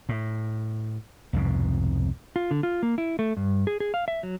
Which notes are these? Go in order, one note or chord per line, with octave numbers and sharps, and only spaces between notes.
A2
C2 F2 G#2 B2
F4
D3
F4
A#3
E4
A3
G2
G#4
G#4
F5
E5
F#3